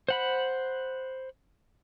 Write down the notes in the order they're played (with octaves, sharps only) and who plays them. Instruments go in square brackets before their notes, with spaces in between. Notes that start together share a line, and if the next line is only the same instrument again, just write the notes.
[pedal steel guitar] C5 F#5 B5